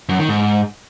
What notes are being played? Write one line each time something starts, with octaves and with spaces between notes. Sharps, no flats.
F#2
D#3
G#2